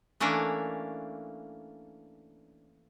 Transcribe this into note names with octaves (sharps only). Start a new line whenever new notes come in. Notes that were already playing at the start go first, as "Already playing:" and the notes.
E3 A3 A#3 C#4 D4